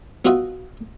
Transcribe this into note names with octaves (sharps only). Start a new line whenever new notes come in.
B3 F4 F#4 D#5 E5 F#5